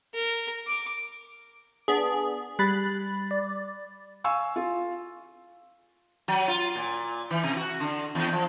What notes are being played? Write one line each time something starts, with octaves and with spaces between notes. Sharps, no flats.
A#4
D6
B3 D4 G#4
G3 B5 F#6 A6
D5
F5 G#5 C#6 E6
F4
F#3
F4
A#2
E3
C3
F#4
D3
E2
F3